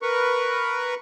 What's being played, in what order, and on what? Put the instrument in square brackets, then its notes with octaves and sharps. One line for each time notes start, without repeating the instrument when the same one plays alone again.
[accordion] A#4 B4 C#6